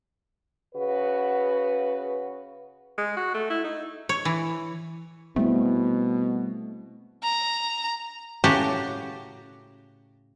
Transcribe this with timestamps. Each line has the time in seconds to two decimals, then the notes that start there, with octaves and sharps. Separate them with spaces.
0.75 C#3 F#4 B4
2.98 G#3
3.17 F#4
3.34 A3
3.50 E4
3.64 D#4
4.09 C#5
4.25 E3
5.36 B2 G3 A3 B3 C4 E4
7.23 A#5
8.44 A2 C#3 F#4 G4 A5 A#5